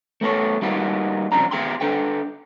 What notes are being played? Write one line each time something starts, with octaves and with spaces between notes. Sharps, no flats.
A3 B3 A4 C#5
G3 A#3 D#4 F4 F#4 B4
C2 C#3 F3 C4 D4 A#5
B3 G#4 G5 C6
D4 A4 B4 G5